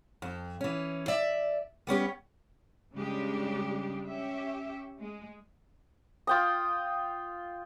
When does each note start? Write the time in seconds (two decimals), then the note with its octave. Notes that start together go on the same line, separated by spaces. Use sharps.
0.22 F2
0.61 E3 C#4
1.08 D5 E5
1.87 G3 B3 C#4 G4
2.95 C#3 G3 G#3 D4 G4
4.06 C#4 G4 E5
5.00 G#3
6.27 F4 G5 D#6